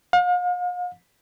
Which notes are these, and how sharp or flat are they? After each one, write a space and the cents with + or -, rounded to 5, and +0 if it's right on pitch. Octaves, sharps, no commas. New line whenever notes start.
F5 +40